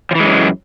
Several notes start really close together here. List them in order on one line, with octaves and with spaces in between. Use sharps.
F3 E3 G#3 F#2